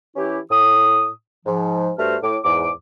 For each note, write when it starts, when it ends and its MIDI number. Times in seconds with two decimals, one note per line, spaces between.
0.16 0.39 52
0.16 0.39 61
0.16 0.39 64
0.16 0.39 67
0.50 1.09 45
0.50 1.09 87
1.45 1.90 44
1.45 1.90 53
1.98 2.16 43
1.98 2.16 57
1.98 2.16 66
1.98 2.16 72
1.98 2.16 89
2.22 2.37 45
2.22 2.37 86
2.44 2.69 40
2.44 2.69 44
2.44 2.69 86